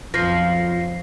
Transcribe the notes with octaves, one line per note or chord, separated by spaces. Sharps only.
B1 F2 F3 A#6 C7